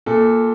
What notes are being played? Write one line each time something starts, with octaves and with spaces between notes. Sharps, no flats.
A#2 A4